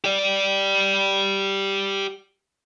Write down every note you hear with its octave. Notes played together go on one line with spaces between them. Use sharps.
G4 D5